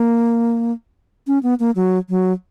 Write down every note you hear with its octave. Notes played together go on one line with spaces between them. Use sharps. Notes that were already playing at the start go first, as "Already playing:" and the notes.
Already playing: A#3
C#4
B3
A#3
F#3
F#3